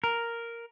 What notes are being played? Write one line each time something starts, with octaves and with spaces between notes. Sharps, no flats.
A#4